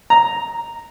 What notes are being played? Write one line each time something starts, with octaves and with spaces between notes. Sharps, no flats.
A#5